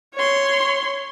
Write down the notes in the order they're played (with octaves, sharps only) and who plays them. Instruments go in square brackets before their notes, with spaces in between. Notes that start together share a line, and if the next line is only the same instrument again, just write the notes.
[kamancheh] C#5 C6